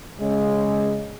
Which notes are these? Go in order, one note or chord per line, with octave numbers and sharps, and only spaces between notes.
C#3 G#3